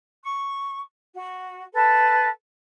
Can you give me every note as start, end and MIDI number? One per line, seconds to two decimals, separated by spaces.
0.24 0.80 85
1.15 1.61 66
1.73 2.28 69
1.73 2.28 71
1.73 2.28 81